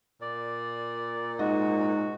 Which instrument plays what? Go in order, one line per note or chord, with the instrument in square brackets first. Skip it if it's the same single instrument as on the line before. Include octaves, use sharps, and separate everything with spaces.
[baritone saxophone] A#2 [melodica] D5
[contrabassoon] G#2 [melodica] F#4 [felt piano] D#5